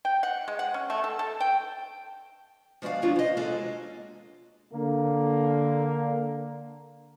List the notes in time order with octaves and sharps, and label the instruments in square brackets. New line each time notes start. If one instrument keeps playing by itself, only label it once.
[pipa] G5
F#5
G#3
F#5
C#4
A3
A4
A4
G5
[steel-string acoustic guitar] F3 G#3 F#4 D5 F5
D#3 F3 B3 C#4 D4 F4
C5 D#5
G#3 A#3 C#4 F#4 G#4 A4
[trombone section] D3 A#3